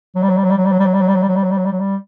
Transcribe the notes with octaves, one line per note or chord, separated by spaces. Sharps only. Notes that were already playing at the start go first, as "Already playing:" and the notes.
F#3
G3
F#3
G3
F#3
G3
F#3
G3
F#3
G3
F#3
G3
F#3
G3
F#3
G3
F#3
G3
F#3
G3
F#3
G3
F#3
G3